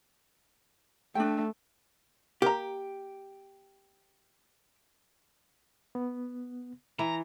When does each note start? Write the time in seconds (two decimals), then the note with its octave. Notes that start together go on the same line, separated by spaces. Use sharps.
1.15 A3 D4 G5
2.42 A#3 G4 A#5
5.95 B3
6.99 E3 A#5